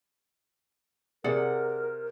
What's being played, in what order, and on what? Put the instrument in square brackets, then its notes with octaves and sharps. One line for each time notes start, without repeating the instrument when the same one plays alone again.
[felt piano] C3 [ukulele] G#4 D5 F#5 [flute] A#4